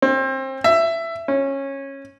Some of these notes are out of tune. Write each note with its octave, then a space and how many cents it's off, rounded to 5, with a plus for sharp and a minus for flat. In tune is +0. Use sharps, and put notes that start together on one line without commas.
C4 +30
E5 +15
C#4 -15